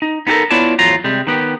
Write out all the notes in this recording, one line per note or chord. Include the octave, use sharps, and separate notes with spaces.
D#4
B3 D#4 F4 G4 A4 A#4
B3 E4 F4 C#5 D5 A5
E2 A2 F3 F#3 F4 A#5
C3 G3 G#3
D#3 B3 G4